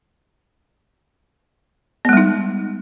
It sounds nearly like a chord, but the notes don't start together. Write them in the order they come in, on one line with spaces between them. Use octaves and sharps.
B3 G#3 G3 D#4